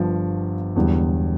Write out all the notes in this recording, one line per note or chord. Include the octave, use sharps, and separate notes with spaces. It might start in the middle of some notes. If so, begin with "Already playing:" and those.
Already playing: G1 G2 F3
E1 E2 D3 G3